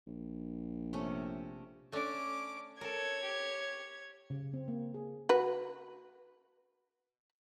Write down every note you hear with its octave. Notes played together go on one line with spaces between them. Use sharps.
A#1
C3 A3 C#4
A3 C#4 D4 D6
A4 A#4 C#5 G#6
G4
C#3
C4
A#3
G#4
F#4 B4